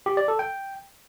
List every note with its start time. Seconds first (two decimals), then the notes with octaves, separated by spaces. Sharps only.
0.06 G4
0.17 D5
0.28 A4
0.39 G5